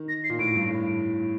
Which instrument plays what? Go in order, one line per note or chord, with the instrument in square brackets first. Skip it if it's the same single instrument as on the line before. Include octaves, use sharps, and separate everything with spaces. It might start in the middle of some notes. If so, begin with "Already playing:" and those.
Already playing: [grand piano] D#3
[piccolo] A#6
C7
[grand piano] A#2
[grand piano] A2 [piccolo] D7
[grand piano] G2
A2